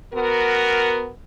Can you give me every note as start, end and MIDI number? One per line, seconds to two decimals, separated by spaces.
0.13 1.08 59
0.13 1.08 66
0.13 1.08 70